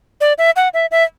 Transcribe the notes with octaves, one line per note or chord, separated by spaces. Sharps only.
D5
E5
F#5
E5
E5